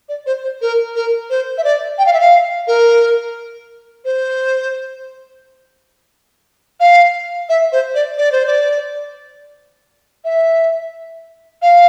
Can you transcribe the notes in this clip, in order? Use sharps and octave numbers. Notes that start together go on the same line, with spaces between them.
D5
C5
C5
A#4
A#4
C5
E5
D5
G5
F5
E5
F5
A#4
C5
F5
E5
C5
D5
D5
C5
D5
E5
F5